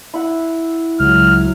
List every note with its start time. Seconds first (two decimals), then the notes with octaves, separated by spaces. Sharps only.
0.14 E4 F#5
1.00 C#2 F#3 F6